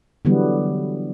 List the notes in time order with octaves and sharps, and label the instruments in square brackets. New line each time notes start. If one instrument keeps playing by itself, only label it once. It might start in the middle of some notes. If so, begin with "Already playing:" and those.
[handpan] D3 E3 F#3 G3 B3